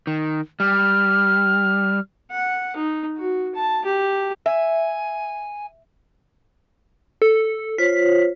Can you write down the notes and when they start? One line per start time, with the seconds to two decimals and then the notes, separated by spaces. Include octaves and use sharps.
0.07 D#3
0.60 G3 F6
2.31 F#5
2.76 D#4
3.18 F#4
3.55 A5
3.85 G4
4.46 E5 G#5
7.22 A4
7.78 F4 C5 C#5 B6